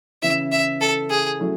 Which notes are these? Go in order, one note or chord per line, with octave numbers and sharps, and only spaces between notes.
C#3 E3 B3 E4 E5
E5
A4
G#4
F#3 A3 C#4 E4